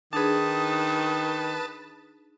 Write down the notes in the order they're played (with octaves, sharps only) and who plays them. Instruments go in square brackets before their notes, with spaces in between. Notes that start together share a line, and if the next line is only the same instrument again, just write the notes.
[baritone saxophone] D#3 [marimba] D4 D#4 G#4 [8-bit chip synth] B4 A5 [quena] D#6